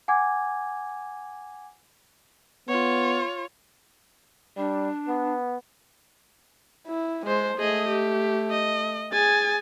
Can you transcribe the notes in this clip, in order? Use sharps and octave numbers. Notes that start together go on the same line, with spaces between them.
F#5 G#5 D6 G#6
B3 F4 C#5
G3 D4
B3
E4
G#3 C5
A3 G#4 D#5
G4
D#5
G#4 G#5 A6